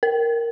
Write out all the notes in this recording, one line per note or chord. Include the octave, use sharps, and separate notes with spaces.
A#4